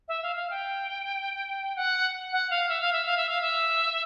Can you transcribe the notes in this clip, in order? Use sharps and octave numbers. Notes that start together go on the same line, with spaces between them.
E5
F5
F5
G5
F#5
F#5
F5
E5
F5
E5
F5
E5
F5
E5